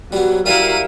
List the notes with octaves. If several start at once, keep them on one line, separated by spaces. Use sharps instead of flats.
F#3 G3 B3
G3 E4 F#4 A#4 E5 F5 A5 D#7